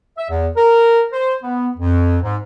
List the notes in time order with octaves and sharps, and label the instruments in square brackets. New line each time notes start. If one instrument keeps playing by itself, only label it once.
[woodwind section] E5
E2
A#4
C5
B3
F2
G#2